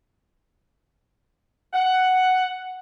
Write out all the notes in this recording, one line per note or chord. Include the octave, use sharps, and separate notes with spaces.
F#5